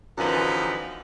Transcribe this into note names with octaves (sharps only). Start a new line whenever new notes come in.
F#2 D3 E3 F3 B3 D#4